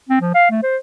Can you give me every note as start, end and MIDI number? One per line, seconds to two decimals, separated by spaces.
0.09 0.21 60
0.21 0.35 53
0.35 0.46 77
0.51 0.62 57
0.63 0.77 72